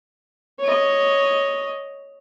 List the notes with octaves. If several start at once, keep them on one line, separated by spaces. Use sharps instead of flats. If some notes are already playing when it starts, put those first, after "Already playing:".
C#5 D#5